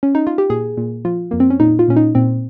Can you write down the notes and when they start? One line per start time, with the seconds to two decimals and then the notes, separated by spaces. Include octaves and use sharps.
0.03 C#4
0.15 D#4
0.27 F4
0.38 G4
0.49 A#2 G#4
0.77 A#2
1.05 F3 F4
1.31 F2 A#3
1.40 C4
1.50 C#4
1.60 A#2 D#4
1.79 F4
1.88 A#2 C#4
1.96 D#4
2.15 A#2 C4